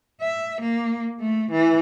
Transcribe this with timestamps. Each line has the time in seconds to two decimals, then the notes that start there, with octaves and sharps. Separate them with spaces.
0.21 E5
0.61 A#3
1.19 A3
1.51 E3